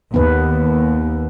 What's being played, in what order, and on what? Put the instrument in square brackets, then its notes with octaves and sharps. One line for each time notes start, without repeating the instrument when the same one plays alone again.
[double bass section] D#2 [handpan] B3 B4